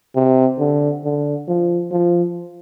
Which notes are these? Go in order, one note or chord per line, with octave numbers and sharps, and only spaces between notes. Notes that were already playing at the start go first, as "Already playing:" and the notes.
C3
D3
D3
F3
F3